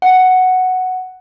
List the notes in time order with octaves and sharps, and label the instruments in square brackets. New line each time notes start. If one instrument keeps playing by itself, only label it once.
[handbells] F#5